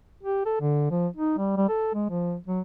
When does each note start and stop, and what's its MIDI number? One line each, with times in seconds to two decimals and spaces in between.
0.23 0.43 67
0.45 0.56 69
0.61 0.89 50
0.91 1.08 53
1.17 1.36 63
1.38 1.52 55
1.57 1.67 55
1.69 1.91 69
1.94 2.08 56
2.10 2.36 53
2.47 2.61 54